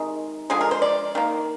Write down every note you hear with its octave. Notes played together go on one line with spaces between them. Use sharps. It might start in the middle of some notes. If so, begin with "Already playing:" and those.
Already playing: C3 D#3 G#3
D3 F3 G#3 G#4
A#4
C5
D5
D#3 A#3